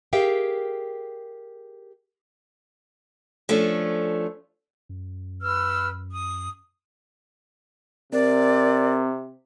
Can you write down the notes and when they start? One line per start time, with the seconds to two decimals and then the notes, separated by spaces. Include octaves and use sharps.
0.13 G4 G#4 A#4 E5 F5 G5
3.49 F3 A3 C#4 D4
4.89 F#2
5.40 B4 E6 F6
6.12 D#6
8.13 C3 C4 A#4 D5